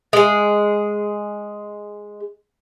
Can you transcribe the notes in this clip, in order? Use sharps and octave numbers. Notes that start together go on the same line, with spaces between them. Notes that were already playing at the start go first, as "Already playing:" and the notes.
G#3 G#4